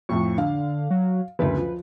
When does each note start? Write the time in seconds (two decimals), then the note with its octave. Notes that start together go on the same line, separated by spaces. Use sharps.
0.09 F2 A2 F3 C#6
0.38 D3 F5
0.90 F#3
1.39 F#1 D2 B4
1.57 F3